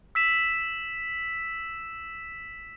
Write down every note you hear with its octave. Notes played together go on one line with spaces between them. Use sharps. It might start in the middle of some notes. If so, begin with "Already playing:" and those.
E6 B6 E7